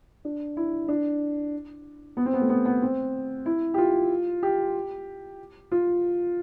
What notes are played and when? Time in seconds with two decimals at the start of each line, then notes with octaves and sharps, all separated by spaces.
0.25 D4
0.57 E4
0.88 D4
2.17 B3
2.26 C4
2.34 B3
2.42 A3
2.49 B3
2.65 B3
2.82 C4
3.46 E4
3.74 G4
3.78 F4
4.43 G4
5.72 F4